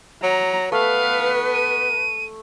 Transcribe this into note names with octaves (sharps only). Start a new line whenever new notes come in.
F#3 A#5
A3 B3 B4 F5
D#7